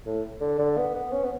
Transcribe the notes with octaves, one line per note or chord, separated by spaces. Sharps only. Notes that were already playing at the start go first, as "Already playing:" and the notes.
A2
D3
D3
B3
B3
C#4
B3